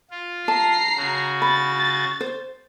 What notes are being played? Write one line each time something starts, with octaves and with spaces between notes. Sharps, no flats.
F4
A5 A#5 C7
C#3 F#4
B5 A6
C5